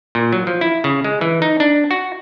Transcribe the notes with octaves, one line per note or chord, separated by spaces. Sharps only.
A#2
F#3
F3
E4
C#3
G#3
E3
D#4
D4
F#4